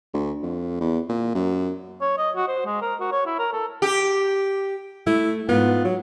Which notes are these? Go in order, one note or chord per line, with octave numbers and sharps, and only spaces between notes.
D2
F2
E2
A#2
F#2
C#5
D#5
F#4
C5
G#3
A#4
F#4
C#5
E4
A#4
A4
G4
A3 E4
G#2 B3 F4
F#3